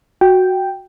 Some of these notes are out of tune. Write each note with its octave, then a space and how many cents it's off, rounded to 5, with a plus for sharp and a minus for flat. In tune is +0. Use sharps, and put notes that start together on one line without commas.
F#4 +0 G5 +0